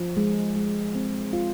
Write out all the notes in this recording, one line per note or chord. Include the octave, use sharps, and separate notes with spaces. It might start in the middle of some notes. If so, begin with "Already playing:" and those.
Already playing: F3
G#3
G#3
C4
F4